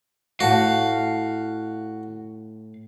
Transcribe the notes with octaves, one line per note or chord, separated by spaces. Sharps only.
A2 F#4 F5 A5